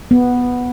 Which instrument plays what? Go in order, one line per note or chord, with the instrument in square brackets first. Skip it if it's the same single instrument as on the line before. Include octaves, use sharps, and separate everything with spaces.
[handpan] B3